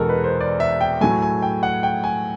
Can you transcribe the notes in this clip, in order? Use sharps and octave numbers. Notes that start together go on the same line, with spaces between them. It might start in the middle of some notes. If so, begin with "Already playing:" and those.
Already playing: E2 B2 G#3 A4 A#4
B4
C5
D5
E5
G5
A2 F#3 A3 G#5
G#5
G5
F#5
G5
G#5